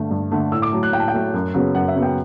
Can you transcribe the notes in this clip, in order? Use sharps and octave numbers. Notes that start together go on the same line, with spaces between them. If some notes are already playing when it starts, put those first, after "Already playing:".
Already playing: G2 D3 A3
G2
D3 A3
A2 E6
D6
F#3 A3
F#6
A2 G5
A5
G5
F#3 A3
F#2
C#3 F#3 B3
F#2 F#5
E5
C#3 F#3 B3
G5